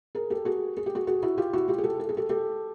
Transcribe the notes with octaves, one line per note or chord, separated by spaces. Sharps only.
G#4 A#4
G4 A4
F#4 G#4
G#4
G4
F#4 G#4
F#4 G#4
E4 F#4
F4 G4
E4 F#4
F4 G4
G#4
G4 A4
A4
G#4
G4 A4
G4 A4